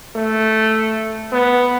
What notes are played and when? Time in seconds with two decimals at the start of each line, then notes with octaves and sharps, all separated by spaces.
0.16 A3
1.32 B3